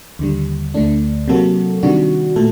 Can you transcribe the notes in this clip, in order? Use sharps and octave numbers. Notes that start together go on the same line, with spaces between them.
D#2 D3 G3
D2 D3 A3 D4
C3 F#3 A#3 F#4 A4
C3 D#3 G3 D4 F#4
A#2 A3 A4